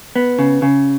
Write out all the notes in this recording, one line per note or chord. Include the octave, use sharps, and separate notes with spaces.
B3
C#3
C#3